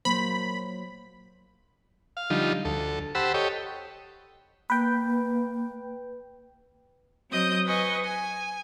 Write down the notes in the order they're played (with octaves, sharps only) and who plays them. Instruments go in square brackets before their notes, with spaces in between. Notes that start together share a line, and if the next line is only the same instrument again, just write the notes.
[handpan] F#3 A#3 C5 [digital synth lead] B5
[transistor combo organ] F5
D3 F3 G3 D#4 F4
D2 A4
G4 C5 F#5 A5 B5 E6
G4 A4 C#5 D#5 G5
[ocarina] A#3 [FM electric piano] B4 G5
[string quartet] F#3 C4 D#5 D#6 G6
B4 D#5 G#5 C#6
G#5